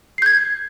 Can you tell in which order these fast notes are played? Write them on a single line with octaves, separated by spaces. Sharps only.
C7 G6 G#6